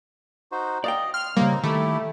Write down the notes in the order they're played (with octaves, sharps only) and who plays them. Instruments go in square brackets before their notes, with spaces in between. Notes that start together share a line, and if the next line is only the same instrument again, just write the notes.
[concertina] D#4 F#4 C5
[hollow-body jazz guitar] D5 F5 G5 [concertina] D#5
[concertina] C6 [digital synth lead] F6
[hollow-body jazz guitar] C#3 G3 [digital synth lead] A#3 [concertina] C4 D#4
[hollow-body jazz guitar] D#3 [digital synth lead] A3 [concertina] E4 G4